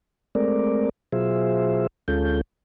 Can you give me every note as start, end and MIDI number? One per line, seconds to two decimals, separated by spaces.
0.35 0.89 56
0.35 0.89 57
0.35 0.89 60
0.35 0.89 70
0.35 0.89 74
1.12 1.87 47
1.12 1.87 54
1.12 1.87 65
1.12 1.87 68
1.12 1.87 72
1.12 1.87 76
2.08 2.41 38
2.08 2.41 56
2.08 2.41 61
2.08 2.41 65
2.08 2.41 69
2.08 2.41 91